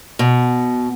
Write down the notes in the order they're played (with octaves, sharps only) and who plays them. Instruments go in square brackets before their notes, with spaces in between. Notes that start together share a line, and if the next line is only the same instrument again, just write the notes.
[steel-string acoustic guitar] B2